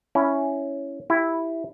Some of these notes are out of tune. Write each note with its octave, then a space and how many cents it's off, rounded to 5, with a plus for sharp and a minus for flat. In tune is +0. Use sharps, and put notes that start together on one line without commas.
C#4 +5 E4 +0
E4 +0 G4 +0